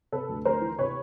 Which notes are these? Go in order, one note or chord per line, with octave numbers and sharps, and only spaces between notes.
C3 A4 B4
D2
D2 A#4 C5
E3
C3 B4 C#5